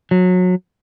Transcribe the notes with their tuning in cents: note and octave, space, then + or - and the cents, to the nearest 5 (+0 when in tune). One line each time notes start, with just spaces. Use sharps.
F#3 -25